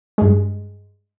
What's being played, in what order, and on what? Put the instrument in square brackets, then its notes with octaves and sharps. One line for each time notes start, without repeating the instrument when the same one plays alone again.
[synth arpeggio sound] G2 G#3